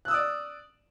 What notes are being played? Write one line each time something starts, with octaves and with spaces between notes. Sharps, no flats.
D5 D#6 E6 F#6